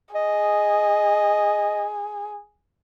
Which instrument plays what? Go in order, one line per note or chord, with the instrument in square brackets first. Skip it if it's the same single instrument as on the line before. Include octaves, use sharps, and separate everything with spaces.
[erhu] G#4 [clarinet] D#5